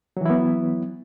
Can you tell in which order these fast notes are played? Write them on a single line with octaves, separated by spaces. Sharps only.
F#3 E3 E4 B3